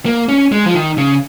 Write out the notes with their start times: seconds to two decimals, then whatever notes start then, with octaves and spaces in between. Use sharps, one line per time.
0.06 A#3
0.29 C#4
0.52 G#3
0.66 F3
0.75 D#3
0.98 C#3